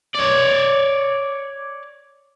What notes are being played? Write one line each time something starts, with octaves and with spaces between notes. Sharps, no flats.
C#5 D5